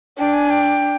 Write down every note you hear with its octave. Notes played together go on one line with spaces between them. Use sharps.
D4 G5
G#5
G5